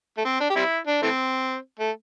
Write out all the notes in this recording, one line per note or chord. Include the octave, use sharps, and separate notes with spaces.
A3
C4
D4
G4
G3 C4 E4
D4
E3 A3 C4
A3